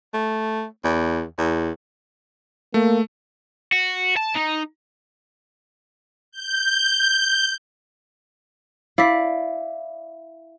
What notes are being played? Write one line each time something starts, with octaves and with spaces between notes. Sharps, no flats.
A3
E2
E2
A3 A#3
F#4
A5
D#4
G6
E4 D5 F5 B6